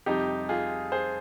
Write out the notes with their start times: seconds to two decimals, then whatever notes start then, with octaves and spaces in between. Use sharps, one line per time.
0.06 F2 C3 G3 D#4 G4
0.49 F4 G#4
0.92 G#4 C5